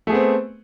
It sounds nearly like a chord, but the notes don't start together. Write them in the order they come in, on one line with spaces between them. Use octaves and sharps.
A3 G#4 B3 C4